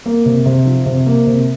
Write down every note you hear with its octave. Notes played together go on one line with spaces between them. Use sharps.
A#3
C3
C3
F3
C3
A#3
C3